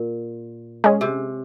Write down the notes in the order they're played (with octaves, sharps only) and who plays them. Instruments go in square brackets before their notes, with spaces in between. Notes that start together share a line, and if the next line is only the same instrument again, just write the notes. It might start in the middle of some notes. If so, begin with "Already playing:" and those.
Already playing: [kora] A#2
[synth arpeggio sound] G#3 C#4 G#4
[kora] C3